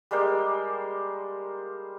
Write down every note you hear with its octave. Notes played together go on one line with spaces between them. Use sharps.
G3 G#3 A#3 C5